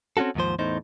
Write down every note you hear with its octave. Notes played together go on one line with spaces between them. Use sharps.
C4 C#4 F4 F#4 A4
D#2 G#2 F3 C5
E2 A2 D#4 C5